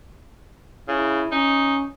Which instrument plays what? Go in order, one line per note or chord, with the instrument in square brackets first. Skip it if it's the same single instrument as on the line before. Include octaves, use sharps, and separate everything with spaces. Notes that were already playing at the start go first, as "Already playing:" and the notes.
[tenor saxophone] C#3 [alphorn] E4
[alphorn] C#4 [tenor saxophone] D#4